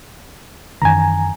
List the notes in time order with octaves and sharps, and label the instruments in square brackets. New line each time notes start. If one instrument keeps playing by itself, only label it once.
[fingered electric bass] F#2 D#3 E3 [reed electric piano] G#5 A#5